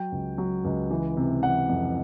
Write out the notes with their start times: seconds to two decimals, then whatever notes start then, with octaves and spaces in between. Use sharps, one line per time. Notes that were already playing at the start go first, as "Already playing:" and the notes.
Already playing: F#3 G5
0.12 C#2
0.38 F#3
0.64 C#2
0.91 E3
1.17 C3
1.42 E3 F#5
1.69 F2